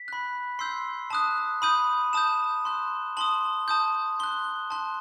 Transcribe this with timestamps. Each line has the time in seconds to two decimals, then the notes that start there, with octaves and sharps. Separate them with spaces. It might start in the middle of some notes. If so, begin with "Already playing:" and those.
Already playing: B6
0.08 B5 F#6
0.59 C6 E6 G6 C7
1.10 A5 D#6 F#6
1.62 B5 D#6 G6 D#7
2.13 A5 D#6 G6 E7
2.65 C6 F#6
3.17 A5 C6 D#6 F#7
3.68 A5 D#6 G6
4.19 C6 F#6 G7
4.71 A5 C6 F#6